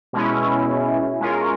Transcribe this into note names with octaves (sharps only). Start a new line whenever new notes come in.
B2 G#3 C#4 E4
G#3 C#4 F4 A#4